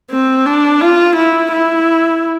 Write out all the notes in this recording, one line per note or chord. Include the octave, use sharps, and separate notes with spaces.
C4
D4
F4
E4
E4